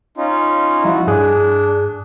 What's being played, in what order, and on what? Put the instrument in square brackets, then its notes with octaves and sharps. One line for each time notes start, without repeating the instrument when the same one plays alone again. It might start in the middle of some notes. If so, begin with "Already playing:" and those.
[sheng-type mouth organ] C#4 D#4 F4
[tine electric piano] F3 G3 E4 [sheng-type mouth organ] F#4
[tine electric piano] G2 G#4 F#6 [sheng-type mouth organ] D4